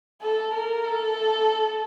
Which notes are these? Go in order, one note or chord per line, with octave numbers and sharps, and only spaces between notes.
A4
A#4
A4